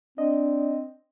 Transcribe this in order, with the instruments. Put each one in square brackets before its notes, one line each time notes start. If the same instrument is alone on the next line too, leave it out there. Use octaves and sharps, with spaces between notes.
[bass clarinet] C4 [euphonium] D4 [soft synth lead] D#5